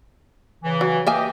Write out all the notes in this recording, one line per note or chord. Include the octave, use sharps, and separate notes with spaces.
C#3 E3
F#3
A#3 G4 D#5 E5 G#5